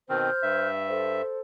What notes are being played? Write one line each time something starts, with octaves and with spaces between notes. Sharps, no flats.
B2 D#3 C4 C5 F6 G6
G2 E5
A4 C5